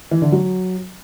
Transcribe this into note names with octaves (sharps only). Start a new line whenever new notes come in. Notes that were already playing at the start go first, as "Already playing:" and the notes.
E3
D3
F#3